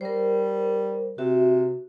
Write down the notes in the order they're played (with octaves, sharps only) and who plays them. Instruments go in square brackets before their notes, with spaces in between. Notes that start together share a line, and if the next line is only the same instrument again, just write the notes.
[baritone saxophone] G3 [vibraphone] A#4 C5
[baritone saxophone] C3 [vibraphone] F#4 E5